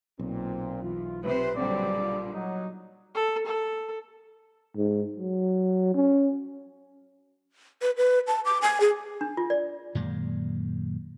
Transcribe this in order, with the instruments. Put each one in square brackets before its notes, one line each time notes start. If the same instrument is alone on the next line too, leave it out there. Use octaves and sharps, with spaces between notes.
[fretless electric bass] B1 [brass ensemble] A#2 C4
[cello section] E2 [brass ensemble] F4
[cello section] C3 C5 [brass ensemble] B4
[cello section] A#2 D3 G3 [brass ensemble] F#3 C4 [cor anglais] D5
[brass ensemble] F4
[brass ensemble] F#3 [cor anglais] D#4
[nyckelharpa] A4
A4
[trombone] G#2
F#3
C#4
[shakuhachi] B4
B4
A5
D6
G#5
G#4
[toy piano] D4
F4
D5
[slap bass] F#2 A#2 D#3 G#3